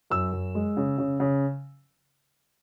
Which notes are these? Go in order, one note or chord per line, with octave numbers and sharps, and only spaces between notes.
F#2 E6
F#2
G#3
C#3
C#3
C#3